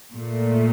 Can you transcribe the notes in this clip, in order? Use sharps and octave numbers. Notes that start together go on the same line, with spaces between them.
A#2 A3